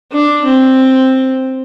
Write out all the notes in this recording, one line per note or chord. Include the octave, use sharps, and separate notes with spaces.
D4
C4